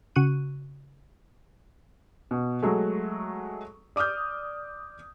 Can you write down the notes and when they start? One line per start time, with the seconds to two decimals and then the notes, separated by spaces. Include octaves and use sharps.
0.16 C#3 F#4 C#6 F#6 D#7
2.31 B2
2.62 F#3 G#3 A3
3.96 D5 D6 D#6 F6 G6